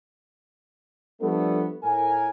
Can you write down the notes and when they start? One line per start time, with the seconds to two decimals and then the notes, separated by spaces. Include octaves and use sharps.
1.21 F3 G3 A3 B3 D4 A4
1.83 A2 A#4 G#5